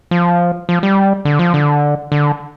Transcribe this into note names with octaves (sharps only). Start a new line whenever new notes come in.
F3
F3
G3
D3
F3
D3
D3